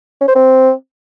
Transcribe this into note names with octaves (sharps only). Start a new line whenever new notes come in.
C#4
C5
C4